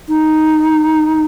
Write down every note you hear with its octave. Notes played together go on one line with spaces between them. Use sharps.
D#4